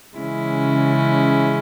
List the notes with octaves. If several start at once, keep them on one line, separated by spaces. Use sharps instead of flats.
C#3 E3 G#3 C#4 E4